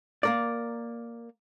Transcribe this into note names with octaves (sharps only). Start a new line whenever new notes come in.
A#3 A#4 D5